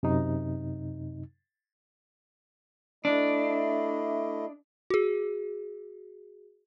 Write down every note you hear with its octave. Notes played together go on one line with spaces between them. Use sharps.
F#2 C3 D#4
A3 D4 E4 D#5
F#4 G#4